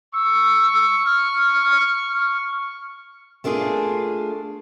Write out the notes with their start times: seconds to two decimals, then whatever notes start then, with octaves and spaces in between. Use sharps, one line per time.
0.13 C#6 E6
1.05 F6
3.44 A3 A#3 D4 F4 G#4